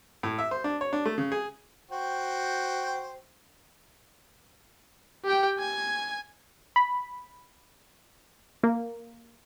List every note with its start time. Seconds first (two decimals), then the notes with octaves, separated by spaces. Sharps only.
0.23 A2
0.38 E5
0.51 C5
0.64 D4
0.81 C#5
0.93 D4
1.05 A3
1.18 C#3
1.32 G#4
1.91 F#4 C5 G5
5.25 G4 G5
5.59 G#5 G#6
6.76 B5
8.63 A#3